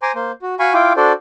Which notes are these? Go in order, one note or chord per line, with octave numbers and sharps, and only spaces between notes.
C5 G#5 A#5 C6 D6
A#3 C5
F#4
F#4 F5 G#5 B5 C#6
E4 F4 F5 G5 D6
D4 F#4 A4 C5 D5